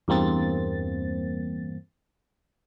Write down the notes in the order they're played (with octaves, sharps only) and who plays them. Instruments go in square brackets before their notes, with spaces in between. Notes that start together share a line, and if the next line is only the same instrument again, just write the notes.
[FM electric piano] E2 G2 A#3 C4 A6